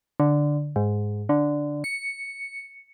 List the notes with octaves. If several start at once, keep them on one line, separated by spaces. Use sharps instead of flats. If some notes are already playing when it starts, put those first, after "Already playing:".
D3
G#2
D3
C#7